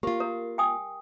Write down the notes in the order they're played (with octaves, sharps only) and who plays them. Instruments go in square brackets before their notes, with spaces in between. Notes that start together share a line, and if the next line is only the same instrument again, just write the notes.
[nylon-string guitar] A#3 F4 [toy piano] G4
[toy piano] A#4
G5 G#5 D#6